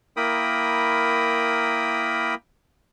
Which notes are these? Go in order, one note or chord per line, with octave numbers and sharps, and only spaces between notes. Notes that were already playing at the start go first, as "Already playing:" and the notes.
A#3 E4 A#4 G5 B5 D#6